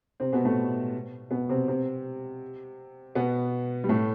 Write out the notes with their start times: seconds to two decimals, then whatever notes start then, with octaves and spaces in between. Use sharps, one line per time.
0.20 C3 C4
0.33 B2 B3
0.44 A2 A3
1.31 B2 B3
1.49 C3 C4
1.68 C3 C4
3.15 B2 B3
3.84 G3
3.89 A2 A3